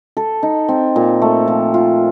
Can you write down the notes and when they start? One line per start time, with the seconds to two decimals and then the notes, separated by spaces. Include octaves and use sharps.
0.17 A4
0.43 D#4
0.68 C4
0.96 A#2
1.22 A3
1.48 F3
1.74 F4